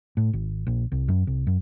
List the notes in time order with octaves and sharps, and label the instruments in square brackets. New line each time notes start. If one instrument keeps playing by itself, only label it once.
[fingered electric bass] A2
G#1
A#1
C2
F#2
C2
F#2